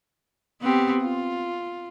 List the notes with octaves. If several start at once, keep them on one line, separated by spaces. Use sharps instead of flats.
B3 C4 G4
F4